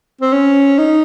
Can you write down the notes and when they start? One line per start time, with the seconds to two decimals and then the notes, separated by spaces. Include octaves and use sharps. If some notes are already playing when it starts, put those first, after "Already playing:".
0.21 C4
0.33 C#4
0.78 D#4